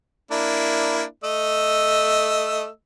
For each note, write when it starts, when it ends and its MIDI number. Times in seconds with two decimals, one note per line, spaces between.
0.31 1.03 58
0.31 1.03 62
0.31 1.03 64
1.24 2.67 57
1.24 2.67 75
1.24 2.67 88